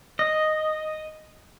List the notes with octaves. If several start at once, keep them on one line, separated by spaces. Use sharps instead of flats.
D#5